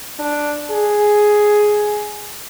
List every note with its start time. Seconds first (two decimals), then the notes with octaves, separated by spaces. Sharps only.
0.19 D4
0.71 G#4